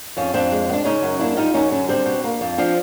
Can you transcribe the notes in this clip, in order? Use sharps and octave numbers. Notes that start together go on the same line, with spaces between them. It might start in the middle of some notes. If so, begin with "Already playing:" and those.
F2 C#4
F2 C4 D4
G#3
B3
D4
C#3 C#4 D#4
F#2
A#3 D4 E4
G3 D#4 F4
F#2 C#4 D#4
D3 C#4
G3 C4 D4
B2
A#3
F2
F3 C4 D4